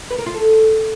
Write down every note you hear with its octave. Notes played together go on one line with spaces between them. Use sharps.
B4
A#4
F4
A4